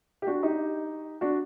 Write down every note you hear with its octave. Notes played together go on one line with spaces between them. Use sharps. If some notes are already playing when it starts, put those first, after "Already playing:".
G4
D4 F#4
D#4 G4
D4 F#4